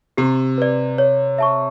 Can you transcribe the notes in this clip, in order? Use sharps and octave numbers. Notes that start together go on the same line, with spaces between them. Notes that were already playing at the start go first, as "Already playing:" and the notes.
C3 G4
B4 D5
C#5
E5 A5 C#6